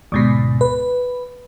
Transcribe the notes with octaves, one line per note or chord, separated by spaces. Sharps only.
D2 G#2 B2
B4